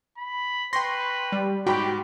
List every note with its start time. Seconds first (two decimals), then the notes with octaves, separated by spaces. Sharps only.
0.18 B5
0.73 B4 G5 C6 C#6 A#6
1.32 G3
1.67 G#2 F#4 G4 G5 B5